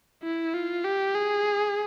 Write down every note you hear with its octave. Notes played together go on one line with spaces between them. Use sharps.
E4
F4
G4
G#4